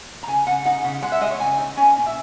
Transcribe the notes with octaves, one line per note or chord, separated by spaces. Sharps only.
A#5
C#3 G#5
C#3 F#5
D#4 F#5
C#3
G#3 F#5
E5
G#3 D#5
C#5
C#3 G#5
D#4
C#4 G#5
A#2
E5